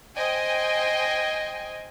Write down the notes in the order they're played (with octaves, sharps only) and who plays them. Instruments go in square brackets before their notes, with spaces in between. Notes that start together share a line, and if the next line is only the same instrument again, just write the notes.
[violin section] C5 D#5 G5 G#5